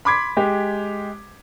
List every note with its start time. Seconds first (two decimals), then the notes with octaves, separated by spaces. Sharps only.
0.05 B5 C6 D6 G#6 B6
0.37 G#3 G4